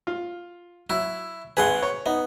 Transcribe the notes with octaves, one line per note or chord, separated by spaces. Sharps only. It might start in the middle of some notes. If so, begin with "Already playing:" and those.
F4
F#3 E4
G#1 G#4 B4 F#5 G#5 C6
C#5
B3 D#4